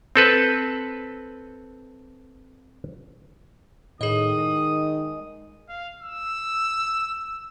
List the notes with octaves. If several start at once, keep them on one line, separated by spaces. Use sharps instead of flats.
C4 A4 B4
A2 D#3 G#4 D#5 D#6
G#3
F5
E6